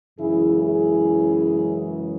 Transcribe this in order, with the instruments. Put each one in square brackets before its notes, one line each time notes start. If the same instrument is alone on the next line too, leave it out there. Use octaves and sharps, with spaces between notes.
[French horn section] F#2 C#3 E3 G#3 E4 G#4
E4 G#4